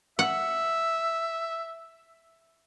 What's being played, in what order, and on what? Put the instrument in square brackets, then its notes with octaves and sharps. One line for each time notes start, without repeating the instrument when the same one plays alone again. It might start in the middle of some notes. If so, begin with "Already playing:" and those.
[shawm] E5 [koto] F#5